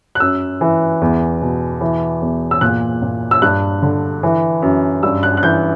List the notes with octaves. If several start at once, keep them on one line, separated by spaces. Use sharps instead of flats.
F#6
F#2 E6
E3
E2
B2
E3
E2
E6
A#2 F#6
A#2
E6
G2 F#6
D3
E3
F#2
G2 E6
F#6
F#6
E3 G6